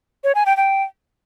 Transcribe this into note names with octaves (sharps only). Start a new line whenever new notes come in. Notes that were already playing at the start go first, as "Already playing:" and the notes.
C#5
G#5
G5
G5